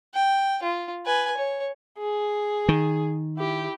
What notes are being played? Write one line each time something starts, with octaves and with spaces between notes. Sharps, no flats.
G5
F4
B4 G#5
C#5
G#4
D#3
E4 G4